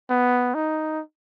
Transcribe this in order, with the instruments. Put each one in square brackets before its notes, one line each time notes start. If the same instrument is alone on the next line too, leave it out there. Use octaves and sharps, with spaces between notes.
[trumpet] B3
D#4